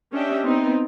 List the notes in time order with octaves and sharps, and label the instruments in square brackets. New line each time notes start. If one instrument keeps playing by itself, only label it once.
[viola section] C#4 D4 G4 D#5 E5 G5
B3 C4 D#4